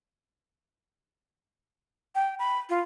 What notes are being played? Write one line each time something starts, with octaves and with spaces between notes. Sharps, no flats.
G5
B5
F4